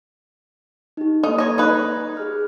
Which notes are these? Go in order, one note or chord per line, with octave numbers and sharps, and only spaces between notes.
D#4 G4
A#3 D#4 A4
C#5 D#5 G#6 A#6
D#4 B4
G4 G#4 F6